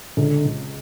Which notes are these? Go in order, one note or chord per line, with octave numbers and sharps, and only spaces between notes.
C#2 D3
C#2